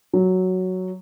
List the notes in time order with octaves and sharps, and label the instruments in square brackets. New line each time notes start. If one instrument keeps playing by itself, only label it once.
[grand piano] F#3